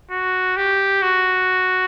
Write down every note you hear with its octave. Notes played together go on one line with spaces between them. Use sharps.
F#4
G4
F#4